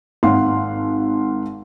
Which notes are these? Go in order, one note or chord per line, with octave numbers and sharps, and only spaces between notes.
G#1 F5 F#5 C6